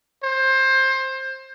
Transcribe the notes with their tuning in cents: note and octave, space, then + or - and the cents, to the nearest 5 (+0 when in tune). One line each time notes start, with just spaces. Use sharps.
C5 +20